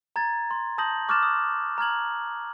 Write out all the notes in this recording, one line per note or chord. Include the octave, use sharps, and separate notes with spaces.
A#5 G#6 A6
C6
A5 D#6 G6 A#6 F#7
C#6 D6 F6 F#6 A6 E7
D#6
A#5 F6 G#6 F#7